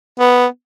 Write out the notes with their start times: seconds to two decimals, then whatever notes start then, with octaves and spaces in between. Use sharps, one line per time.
0.20 B3